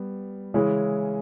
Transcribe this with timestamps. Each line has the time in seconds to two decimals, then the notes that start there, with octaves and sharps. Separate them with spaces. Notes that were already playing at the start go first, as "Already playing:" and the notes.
Already playing: G3 B3
0.54 C#3 E3 G#3 C#4 E4